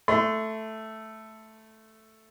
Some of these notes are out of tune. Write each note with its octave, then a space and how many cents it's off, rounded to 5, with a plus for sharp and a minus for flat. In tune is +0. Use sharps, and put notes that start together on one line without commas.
A3 +0 C6 -35